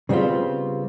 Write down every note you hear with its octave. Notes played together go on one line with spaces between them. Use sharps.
C#3 G3 B3 C4 F4